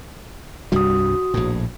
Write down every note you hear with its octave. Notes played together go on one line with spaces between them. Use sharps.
C2 G2 G3 F#4 D#6
A#1 A2